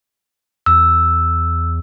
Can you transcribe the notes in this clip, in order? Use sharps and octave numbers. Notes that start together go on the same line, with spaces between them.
E2 E6